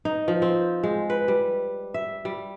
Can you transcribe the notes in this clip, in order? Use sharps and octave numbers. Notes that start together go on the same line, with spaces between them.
D#4
F3
C4
G#3
B4
G3
E5
G3